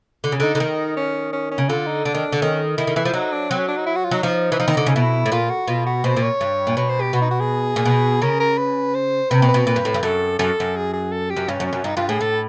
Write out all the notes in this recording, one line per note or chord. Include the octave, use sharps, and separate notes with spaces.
D3
C#3
D3 D#4
D3
D#3
C#4
C#4
C#4
C#3
D3 F4
D#4
D3 D4
D#3
D3
D#3 C#4
D#3 E4
D#3
E3 E4
F3
F#3 D#4
D4
F#3 C4
C#4
D4
D#4
E4
F#4
F4
F#3 D#4
F3 D#4
E3
F3 D#4
D#3
D3
C#3
B2 E4
A2
A#2 F4
F#4
B2 F4
F#4
B2 C5
A#2
C#5
G2
A#2
B2 C#5
C5
G4
B2 F#4
D#4
F#4
G#4
A#2
B2
C#3 A#4
A#4
B4
C5
C3 B4
B2
B4
B2
A#2
G2
A2
G2
F#2 A4
F#2 A4
F#2
G#4
G#4
A4
G4
F#2
G2 C#4
F#2
C#4
F#2
G2 D#4
G2 F4
A2 G#4
A2 A4